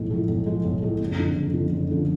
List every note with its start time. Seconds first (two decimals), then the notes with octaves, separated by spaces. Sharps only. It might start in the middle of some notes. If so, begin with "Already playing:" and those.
Already playing: B1 A2 F3 G#3
0.10 A2 F3 G#3
0.28 B1
0.46 A2 F3 G#3
0.64 B1
0.82 A2 F3 G#3
1.00 F#1
1.18 F2 D3 F3
1.36 F#1
1.54 F2 D3 F3
1.72 F#1
1.90 F2 D3 F3